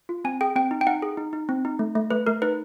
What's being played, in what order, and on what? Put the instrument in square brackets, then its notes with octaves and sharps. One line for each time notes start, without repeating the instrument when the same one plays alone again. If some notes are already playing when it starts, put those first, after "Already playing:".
[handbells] F4
C4 G#5
G#4 G5
C4 G5
D#4
G5
D#4 F#5
G#4
D#4
D#4
C4
D#4
A3
A3
A3 B4
A3 A#4
D#4 B4